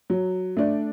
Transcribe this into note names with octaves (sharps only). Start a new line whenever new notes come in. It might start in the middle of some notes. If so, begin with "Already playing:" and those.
F#3
A3 D4